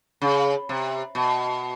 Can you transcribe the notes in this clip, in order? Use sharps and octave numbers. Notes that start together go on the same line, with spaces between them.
C#3
C3
B2